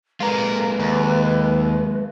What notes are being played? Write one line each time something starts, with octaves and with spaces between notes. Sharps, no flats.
G#3 A#3 F4 A#4 B4
D#2